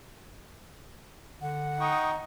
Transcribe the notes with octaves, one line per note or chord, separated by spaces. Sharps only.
D3 F#5
D#4 G5 C#6 D#6